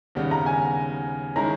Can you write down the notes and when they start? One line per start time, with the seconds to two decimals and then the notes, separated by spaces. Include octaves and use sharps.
0.15 D#2 C#3 G3 B3
0.31 A#5
0.46 G#5
1.36 D#3 G#3 C#4 E4 A#5